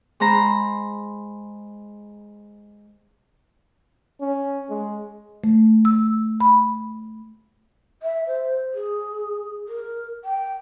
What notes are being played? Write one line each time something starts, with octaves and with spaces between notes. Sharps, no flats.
G#3 C5 A#5 B5
C#4
G#3
A3
E6
B5
E5
C5
G#4
A#4
G5